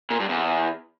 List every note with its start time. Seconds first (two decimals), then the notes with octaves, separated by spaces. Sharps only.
0.10 A#2
0.20 G2
0.29 E2